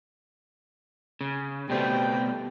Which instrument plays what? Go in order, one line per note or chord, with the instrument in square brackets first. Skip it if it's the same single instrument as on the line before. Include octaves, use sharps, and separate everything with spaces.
[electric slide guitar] C#3
[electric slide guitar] B2 A3 B3 [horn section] G3 C4 G5